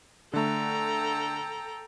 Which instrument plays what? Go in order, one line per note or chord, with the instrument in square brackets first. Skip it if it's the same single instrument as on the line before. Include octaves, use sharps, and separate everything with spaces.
[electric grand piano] D3 A3 [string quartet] A4 G5 A#5